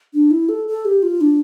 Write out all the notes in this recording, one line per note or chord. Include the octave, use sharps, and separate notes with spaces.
D4
E4
A4
A4
G4
F4
D4